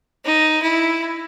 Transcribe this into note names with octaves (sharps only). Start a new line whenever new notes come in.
D#4
E4